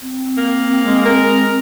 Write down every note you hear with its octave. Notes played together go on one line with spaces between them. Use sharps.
C4
A#3
G#3
A#4